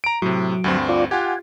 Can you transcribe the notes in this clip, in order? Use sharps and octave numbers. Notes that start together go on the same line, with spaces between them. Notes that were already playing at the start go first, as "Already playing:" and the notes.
A#5 D7
A2 C3 F#3
D2 G2 C4
F4 D5
F4 G4 F#5 G#5